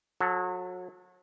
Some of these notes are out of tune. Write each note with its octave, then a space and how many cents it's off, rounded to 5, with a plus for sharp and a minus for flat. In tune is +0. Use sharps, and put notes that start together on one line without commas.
F#3 -30 A4 +0